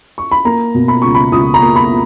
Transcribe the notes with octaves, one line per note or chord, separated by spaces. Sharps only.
C#6
B5
A#3 A#5
B2
B5
C#2 C#6
B5
C#2 D#6
A#5
A#3
B5